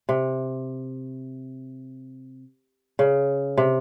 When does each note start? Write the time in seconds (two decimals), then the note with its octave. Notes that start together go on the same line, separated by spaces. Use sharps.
0.09 C3
2.99 C#3
3.58 C3